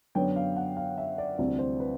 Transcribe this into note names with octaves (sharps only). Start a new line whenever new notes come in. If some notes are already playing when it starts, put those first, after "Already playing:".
F#2 D3 F#3 B3 D4 G5
F5
F#5
F5
E5
D5
D2 C3 E3 G3 C4 D5
C5
B4